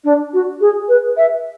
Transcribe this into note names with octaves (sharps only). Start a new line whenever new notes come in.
D4
F#4
G#4
B4
E5